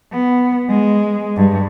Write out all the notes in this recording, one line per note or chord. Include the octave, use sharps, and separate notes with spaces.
B3
G#3
G2